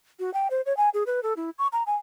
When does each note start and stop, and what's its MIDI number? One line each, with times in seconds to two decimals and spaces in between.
0.19 0.33 66
0.34 0.48 79
0.50 0.61 72
0.66 0.75 73
0.77 0.89 80
0.94 1.03 68
1.06 1.23 71
1.23 1.33 69
1.36 1.50 64
1.58 1.67 85
1.73 1.83 82
1.87 1.96 80